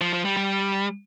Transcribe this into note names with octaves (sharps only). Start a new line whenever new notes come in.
F3
F3
G3
G3